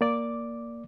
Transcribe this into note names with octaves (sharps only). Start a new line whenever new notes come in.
A#3 D5 D6